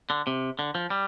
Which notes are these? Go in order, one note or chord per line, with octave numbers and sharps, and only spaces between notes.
D3
C3
D3
F3
G3